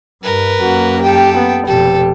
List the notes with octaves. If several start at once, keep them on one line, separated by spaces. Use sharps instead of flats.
G2 A#4 B4
F#2 A#3 F#4
G4 A4 G5
B3
F1 B2 G4 A4